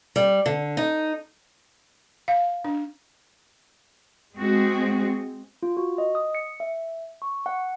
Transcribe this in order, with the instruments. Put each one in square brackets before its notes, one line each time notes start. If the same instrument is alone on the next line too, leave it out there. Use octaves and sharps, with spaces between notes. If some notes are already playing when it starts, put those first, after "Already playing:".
[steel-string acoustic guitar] G3
D3
D#4
[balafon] F5
D4
[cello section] G#3 C4 F#4 G#4
[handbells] F4
F#4
D#5
D#6
C#7
E5
C#6
F#5